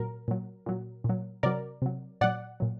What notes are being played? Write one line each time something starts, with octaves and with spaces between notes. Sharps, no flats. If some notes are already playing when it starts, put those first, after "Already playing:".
Already playing: A#2 F#3 A#4
A#2 F#3
A#2 F#3
A#2
F#3
C3 F#3 A#4 D5
C3 F#3
A#2 F#3 D5 F#5
A#2 F#3